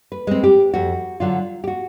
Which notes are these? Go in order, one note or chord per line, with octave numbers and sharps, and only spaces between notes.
B4
G#3 C4
G4
F2 F#4
D3 F#3 F4
G4
F#4